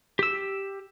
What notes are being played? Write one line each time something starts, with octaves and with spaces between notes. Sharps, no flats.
G4 E6